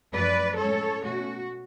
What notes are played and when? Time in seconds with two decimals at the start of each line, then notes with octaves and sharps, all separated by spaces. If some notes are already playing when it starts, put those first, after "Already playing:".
0.14 F#2 F3 A3 B4 D5
0.59 A2 G#3 C#4 A4 C#5
1.04 B2 A3 C#4 F#4